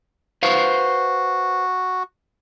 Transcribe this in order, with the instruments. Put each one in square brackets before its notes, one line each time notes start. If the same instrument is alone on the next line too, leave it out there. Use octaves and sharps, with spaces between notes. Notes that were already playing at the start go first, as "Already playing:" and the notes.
[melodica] F#4 [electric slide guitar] B4 C5 F5